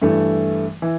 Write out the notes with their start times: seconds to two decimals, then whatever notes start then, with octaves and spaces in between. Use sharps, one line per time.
0.02 G2 E3 A3
0.82 E3